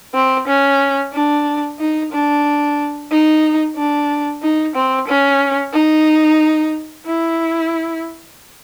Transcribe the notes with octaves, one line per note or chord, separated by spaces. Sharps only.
C4
C#4
D4
D#4
D4
D#4
D4
D#4
C4
C#4
D#4
E4